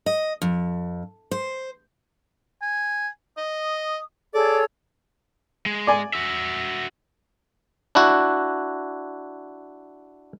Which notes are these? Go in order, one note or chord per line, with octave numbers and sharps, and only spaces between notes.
D#5
F2
C5
G#5
D#5 D#6
G#4 A4 C#5 D5
G#3
D5 G#5
F#4 E5
D4 E4 F#4